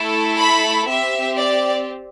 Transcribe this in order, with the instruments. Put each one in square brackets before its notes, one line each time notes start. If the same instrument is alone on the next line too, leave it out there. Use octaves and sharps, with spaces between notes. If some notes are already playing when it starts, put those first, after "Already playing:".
Already playing: [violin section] A3 E4 A4
B5
C4 G4 E5
D5